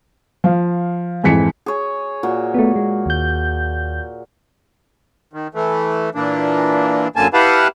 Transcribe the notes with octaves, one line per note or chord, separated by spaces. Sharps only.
F3 F5
F2 G#2 E3 B6 C#7
G#4 C#5
A#2 F#4
A3 B3
G#3
D#2 G6
D#3
E3 A3
A#2 E3 A#3 D4
F#2 D3 A#3 G#5 A5
E4 G4 B4 F5 F#5 A5